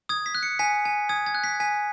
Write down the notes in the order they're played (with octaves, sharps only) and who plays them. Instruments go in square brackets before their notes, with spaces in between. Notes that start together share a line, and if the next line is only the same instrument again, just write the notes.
[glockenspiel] D#6 G#6
B6
F#6
C#7
G#5 B6
G#5
D#6 G#6
G#6
F#6
B6
G#5 B6